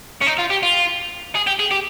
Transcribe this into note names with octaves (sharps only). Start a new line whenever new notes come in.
C#4
D#4
F4
G4
F4
G#4
G4
G#4
G4